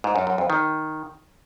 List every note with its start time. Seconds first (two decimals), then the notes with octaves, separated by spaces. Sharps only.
0.04 G#2
0.16 F#2
0.27 F#2
0.38 F2
0.50 D#3